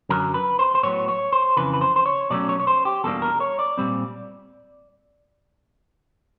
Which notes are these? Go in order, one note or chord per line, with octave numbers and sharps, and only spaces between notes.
F#2 D3 F#3 A#4
B4
C5
C5
A2 F#3 B3 C#5
C#5
C5
F2 C#3 E3 B4
B4
C5
C5
C#5
B2 F#3 A3 C#4 D5
C#5
C#5
C5
G4
E2 B2 G3 A#3 D4 A4
A#4
C#5
D5
A#2 G3 C4